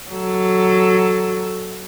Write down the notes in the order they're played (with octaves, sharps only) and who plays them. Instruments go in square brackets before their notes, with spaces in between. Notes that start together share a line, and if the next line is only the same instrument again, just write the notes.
[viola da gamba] F#3 A4